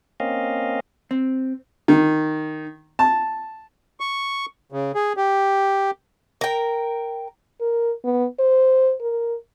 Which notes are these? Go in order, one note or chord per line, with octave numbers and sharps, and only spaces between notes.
A#3 C4 C#4 D#5 F5
C4
D#3
A5
C#6
C#3
G#4
G4
A#4 G5
A#4
B3
C5
A#4